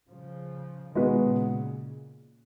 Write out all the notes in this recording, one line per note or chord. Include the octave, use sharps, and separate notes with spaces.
C#3 F3
B2 D#3 G#3 B3 D#4 F#4 B4
A#2 C#3